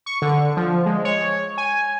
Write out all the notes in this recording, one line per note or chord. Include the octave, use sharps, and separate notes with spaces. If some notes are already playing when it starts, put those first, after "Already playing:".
C#6
D3
F3
G#3
C#5
G#5